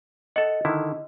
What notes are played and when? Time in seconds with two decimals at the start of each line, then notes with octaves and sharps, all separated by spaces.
0.36 A4 D#5 F#5
0.65 D3 D#3 E4